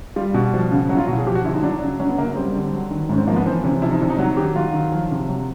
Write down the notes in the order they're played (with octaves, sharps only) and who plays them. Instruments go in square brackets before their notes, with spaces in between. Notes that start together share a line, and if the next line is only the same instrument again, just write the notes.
[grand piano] G3 F4
B2 F#4
F#4
F3
C#3
F#3 F#4
E4
F4
B2 F#4
G#4
F3 G4
F#4
D3 E4
D#4
F#3 D4
C#3
F#3 C#4
B3
C#3 A#3
G3 C4
D3
F#3
D#3
G#2 C#4
C4
F3 A#3
B3
E3 C4
C3 C#4
F3 E4
D#4
C3 D4
D#4
F#3 F#4
D#3 G4
F#3 F4
D#3
F3
C3
F#3